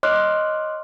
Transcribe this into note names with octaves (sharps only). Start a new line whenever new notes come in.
C#5 D#5 C6 D6 F6 F#6